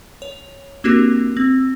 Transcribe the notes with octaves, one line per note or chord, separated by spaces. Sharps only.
C#5
A#3 C4 D4 F#4 G4 A#4
C4